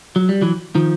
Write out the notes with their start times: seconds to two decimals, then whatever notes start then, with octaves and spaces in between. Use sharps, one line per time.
0.16 F#3
0.29 G3
0.42 E3 F#3
0.75 D#3 F3